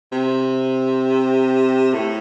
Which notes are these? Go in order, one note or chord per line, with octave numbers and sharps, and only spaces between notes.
C3
A2